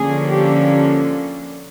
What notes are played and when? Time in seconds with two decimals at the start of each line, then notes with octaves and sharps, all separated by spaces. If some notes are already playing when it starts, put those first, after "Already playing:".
Already playing: D3 F3 A#3 C#4 G#4
0.29 G4